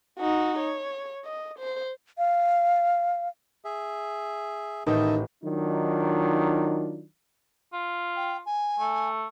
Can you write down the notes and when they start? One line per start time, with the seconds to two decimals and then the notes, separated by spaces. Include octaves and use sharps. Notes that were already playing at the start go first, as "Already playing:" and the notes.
0.19 D#4 F#4
0.59 C#5
1.25 D#5
1.59 C5
2.18 F5
3.65 G#4 E5
4.86 A1 D#3 D#4 D#5 E5 A5 G6
5.44 D#3 F#3 D4 D#4 F4
7.73 F4
8.16 G5
8.46 G#5
8.79 A3